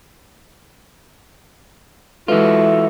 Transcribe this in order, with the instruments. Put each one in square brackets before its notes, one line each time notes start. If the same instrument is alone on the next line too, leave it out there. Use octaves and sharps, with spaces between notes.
[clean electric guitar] E3 F4 [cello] G#3 F#4 [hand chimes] A4 B4 [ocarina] E5